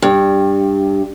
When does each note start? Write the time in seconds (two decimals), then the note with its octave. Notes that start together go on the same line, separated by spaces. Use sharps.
0.02 G2